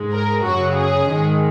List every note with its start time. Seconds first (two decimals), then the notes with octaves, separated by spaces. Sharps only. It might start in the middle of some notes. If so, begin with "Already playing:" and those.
Already playing: G#2 G#3
0.12 A#4
0.44 F#2 C#3 F#3 F#4
0.74 G#4
1.05 G#2 D#3 G#3